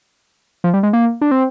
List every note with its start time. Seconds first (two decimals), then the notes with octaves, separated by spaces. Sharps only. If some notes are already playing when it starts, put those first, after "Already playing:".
0.64 F3
0.74 G3
0.83 G#3
0.93 A#3
1.21 D4
1.31 C4